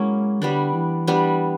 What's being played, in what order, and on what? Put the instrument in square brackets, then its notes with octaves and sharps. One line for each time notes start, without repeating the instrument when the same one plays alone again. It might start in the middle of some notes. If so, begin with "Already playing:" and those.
Already playing: [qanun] F#3 A#3 C#4 E4 [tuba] G#3
[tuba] D3 [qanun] G3 B3 D4
[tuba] E3
[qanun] G3 B3 D4